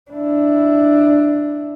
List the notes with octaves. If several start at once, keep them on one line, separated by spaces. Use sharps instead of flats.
D4 E4